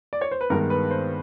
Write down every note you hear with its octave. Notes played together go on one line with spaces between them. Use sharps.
D5
C#5
C5
B4
G2 D#3 G#3 B3 A#4
B4
C5